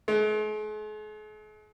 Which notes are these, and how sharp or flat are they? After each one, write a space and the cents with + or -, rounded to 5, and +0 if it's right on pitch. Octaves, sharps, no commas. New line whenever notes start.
G#3 +45